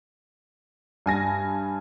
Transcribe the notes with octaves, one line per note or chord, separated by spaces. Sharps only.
G2 G#5 A#6